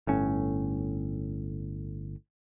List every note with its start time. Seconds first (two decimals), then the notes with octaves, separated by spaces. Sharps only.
0.07 G1 A2 C#4